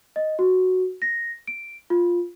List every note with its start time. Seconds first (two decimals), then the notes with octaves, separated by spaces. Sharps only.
0.16 D#5
0.39 F#4
1.02 A#6
1.47 D7
1.90 F4